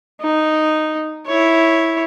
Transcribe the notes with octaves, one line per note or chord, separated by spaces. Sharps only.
D#4
E4 C#5